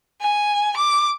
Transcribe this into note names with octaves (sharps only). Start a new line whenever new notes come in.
G#5
D6